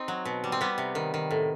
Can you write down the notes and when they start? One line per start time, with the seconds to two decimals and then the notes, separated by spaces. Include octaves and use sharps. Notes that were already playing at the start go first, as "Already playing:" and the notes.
Already playing: C4 D#4
0.08 F#3
0.25 B2
0.44 G3
0.52 C4
0.61 G3 B3
0.78 C3
0.95 D#3
1.14 D#3
1.31 A2